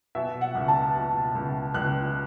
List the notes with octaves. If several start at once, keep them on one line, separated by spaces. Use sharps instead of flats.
B2 E5
F#5
C#2
A5
B2
C#2
C#2 F#6